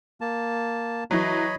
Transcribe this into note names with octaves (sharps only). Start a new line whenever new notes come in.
A#3 A5
E3 F#3 C#5 D#5 B5